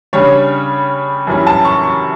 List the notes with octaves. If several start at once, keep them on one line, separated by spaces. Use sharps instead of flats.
C#3 G3 D4 C#5
F#2 E3 G3 C#4
A5
C#6
C#6